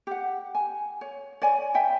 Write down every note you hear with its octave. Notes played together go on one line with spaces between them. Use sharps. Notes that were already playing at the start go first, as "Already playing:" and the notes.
G4 F#5
G#5
C#5
C#5 D5 G#5
E5 G5 G#5 B5